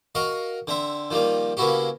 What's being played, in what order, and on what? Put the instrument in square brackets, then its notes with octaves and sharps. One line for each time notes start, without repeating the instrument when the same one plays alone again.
[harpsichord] F#4 A#4 D#5 F5
D3 C4 E5
D#3 F3 G3 A#3
C#3 A#3 B3 E4 F#4 G4